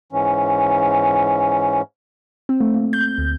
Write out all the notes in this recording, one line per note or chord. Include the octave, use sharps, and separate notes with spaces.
G#2 E3 C#4
C4
A3
A#2
G6
D2